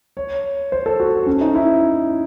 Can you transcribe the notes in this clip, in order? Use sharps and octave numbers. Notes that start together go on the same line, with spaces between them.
C#5
C5
A4
F#4
C#4
D#4
E4